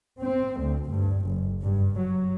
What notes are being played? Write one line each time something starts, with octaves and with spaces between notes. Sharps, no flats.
C4
D2
G2
F#1
G2
F#3